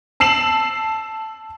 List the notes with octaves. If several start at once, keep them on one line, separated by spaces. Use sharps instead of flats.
A5 E6 C7 E7 F#7